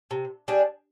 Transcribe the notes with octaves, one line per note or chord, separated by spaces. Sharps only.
C3
G3 D4 G#4